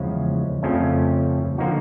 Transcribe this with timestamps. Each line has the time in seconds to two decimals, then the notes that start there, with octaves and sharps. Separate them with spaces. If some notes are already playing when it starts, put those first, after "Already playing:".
Already playing: E2 C#3 F3 G#3 C#4
0.63 F2 C#3 F3 A3 C#4
1.58 D3 F3 A#3 D#4 F#4